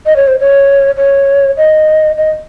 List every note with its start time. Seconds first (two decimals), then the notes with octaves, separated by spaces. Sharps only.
0.06 D#5
0.16 C#5
0.27 C5
0.40 C#5
0.97 C#5
1.57 D#5
2.18 D#5